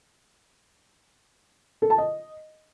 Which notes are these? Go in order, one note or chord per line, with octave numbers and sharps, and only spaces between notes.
A4
A5
D#5